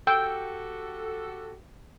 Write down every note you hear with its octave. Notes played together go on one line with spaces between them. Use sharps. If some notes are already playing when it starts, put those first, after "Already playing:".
F#4 G4 A4 G5 E6